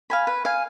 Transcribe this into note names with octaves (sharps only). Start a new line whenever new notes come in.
F5 G#5 B5
B4
F5 G#5